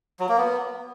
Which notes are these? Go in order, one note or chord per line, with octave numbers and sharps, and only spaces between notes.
F#3
A#3
B3